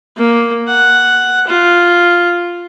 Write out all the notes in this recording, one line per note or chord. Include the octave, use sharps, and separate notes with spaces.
A#3
F#5
F4